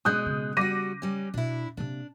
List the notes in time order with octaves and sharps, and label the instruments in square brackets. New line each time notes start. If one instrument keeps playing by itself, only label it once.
[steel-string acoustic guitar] B2 G#3 [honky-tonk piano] D#6 F#6 G6
[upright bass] C#3
[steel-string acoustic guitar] G3 F#4 [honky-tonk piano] D6 A#6 D#7
[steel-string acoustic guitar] G3 C#4
[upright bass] B2 [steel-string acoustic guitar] D4 E4
[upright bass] C3 A#3 [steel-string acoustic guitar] D4